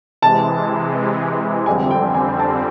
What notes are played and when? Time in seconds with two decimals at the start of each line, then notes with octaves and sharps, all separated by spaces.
0.22 C3 E3 G#3 A5
1.66 F2 D3 G3 C4 G#5
1.91 G5
2.14 G#5
2.39 A5